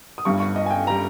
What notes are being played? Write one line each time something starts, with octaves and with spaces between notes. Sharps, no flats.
D#6
G1 G2 G3 C#6
C#6
D#5
G#5
G5
G3 A#5